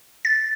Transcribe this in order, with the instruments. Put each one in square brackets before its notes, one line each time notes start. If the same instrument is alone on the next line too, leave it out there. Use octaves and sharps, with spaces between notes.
[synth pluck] A6